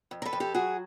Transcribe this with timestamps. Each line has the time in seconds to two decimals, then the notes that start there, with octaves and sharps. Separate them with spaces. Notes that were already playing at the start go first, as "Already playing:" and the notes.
0.11 F2
0.22 A#4
0.25 A4 B4
0.33 F2
0.40 G4 A4
0.54 F#3 F#4 G#4